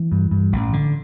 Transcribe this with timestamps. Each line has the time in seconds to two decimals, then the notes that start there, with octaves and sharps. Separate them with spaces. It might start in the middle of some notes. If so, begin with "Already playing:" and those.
Already playing: E3
0.12 G2
0.31 G2
0.52 A1
0.73 D3